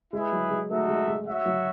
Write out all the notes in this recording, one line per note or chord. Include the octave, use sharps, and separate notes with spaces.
G#3 E4 G#4 B4
F#3
G#3
A3 D#4 F#4 A4 E5
G#3
G#3
F#4 C#5 E5
F#3